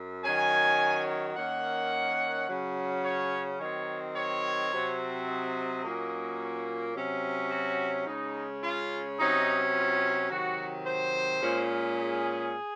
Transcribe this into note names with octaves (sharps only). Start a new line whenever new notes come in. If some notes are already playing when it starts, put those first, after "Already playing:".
Already playing: F#2
D#3 F#3 C#4 G#5
D#3 A#3 C#4 F#5
C#3 F#3 C#4
C#5
D#3 F#3 C4 C#5
C#5
C3 F#3 C4
D#5
A#2 F#3 A#3 C#4
C3 F#3 C#4
F#4
C#3 G#3 C#4 D#4
F4
C3 F#3 C#4 D#4
F4
C3 D#3 F#3 F#4
C5
A#2 G#3 C#4
G#4